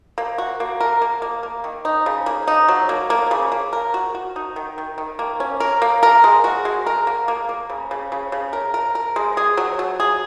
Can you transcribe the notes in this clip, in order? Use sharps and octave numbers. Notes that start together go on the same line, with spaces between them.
A#3
F#4
A#3
A#4
A#3
A#3
A#3
D#3
D#4
C#3
A#3
D#4
F#3
A#3
A#3
C#3
A#3
A#4
F#4
F#4
D#4
D#3
D#3
D#3
A#3
C#4
A#4
A#3
A#4
G#3
F#4
G#3
A#4
A#3
A#3
A#3
C#3
C#3
C#3
C#3
A#4
A#4
A#4
G#3
G#4
F#3
F#3
G#4